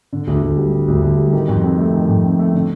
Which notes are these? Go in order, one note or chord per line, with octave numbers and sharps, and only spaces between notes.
D3
D2
D2
G3
D3
D2
D2
G3
D#3
F2
C4
A3
D#3
F2
C4
A3
D3